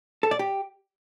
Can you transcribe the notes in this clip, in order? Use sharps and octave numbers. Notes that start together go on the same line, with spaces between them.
A4
D5
G4